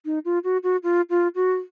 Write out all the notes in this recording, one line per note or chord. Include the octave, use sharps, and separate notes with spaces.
D#4
F4
F#4
F#4
F4
F4
F#4